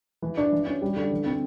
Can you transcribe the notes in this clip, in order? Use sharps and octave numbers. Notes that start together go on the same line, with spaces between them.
E3
D4
E3
C#4
G3
D3
E3
C4